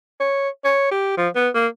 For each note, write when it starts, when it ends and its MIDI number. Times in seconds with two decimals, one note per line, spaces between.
0.20 0.49 73
0.64 0.90 73
0.91 1.15 67
1.17 1.28 53
1.35 1.49 59
1.55 1.67 58